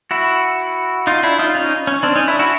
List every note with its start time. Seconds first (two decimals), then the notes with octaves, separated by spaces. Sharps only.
0.11 E4 F#4
1.07 D#4 F4
1.23 D4 E4
1.39 D#4 F4
1.55 C#4 D#4
1.87 C#4
2.03 C4 D4
2.16 C#4 D#4
2.27 D4 E4
2.39 E4 F#4